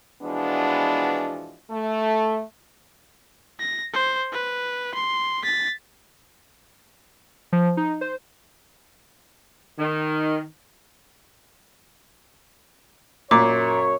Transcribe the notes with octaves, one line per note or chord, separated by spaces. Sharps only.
B2 E3 F3 G#3 B3 D4
A3
A#6
C5
B4
C6
A6 B6
F3
D#4
C5
D#3
F#2 A#2 C#5 D6